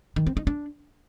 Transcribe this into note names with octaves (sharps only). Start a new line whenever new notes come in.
D#3
C4
D#4
D4